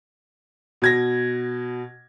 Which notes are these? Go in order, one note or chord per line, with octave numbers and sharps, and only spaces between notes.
B2 G#6 A#6